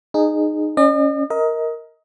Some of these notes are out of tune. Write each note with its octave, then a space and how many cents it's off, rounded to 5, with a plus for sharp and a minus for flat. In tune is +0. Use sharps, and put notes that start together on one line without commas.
D#4 -20 G#4 +0
C#4 +0 D#5 -45
A#4 +0 D#5 +25